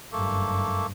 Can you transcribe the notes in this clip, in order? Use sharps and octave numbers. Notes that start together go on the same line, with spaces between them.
F#1 G2 A3 A#3